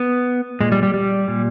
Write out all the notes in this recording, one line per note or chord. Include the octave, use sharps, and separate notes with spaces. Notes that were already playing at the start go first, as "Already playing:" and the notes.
Already playing: B3
A#2 G#3
G3
G3
G3
A#2